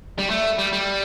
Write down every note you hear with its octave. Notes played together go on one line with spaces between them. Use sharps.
G3
A3
G3
G3